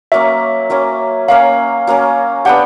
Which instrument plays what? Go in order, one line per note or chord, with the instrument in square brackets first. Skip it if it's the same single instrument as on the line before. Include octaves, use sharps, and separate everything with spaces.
[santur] F#3 A#3 C#4 [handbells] E5
[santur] F#3 A#3 C#4
[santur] F#3 A#3 C#4 [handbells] F5
[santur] F#3 A#3 C#4
[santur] B3 D4 G4 [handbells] F#5